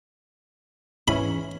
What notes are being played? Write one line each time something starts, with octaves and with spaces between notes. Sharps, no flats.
G#2 E3 C#4 B5